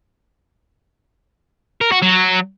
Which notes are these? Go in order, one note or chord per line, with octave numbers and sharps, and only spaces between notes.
A#4
F#4
F#3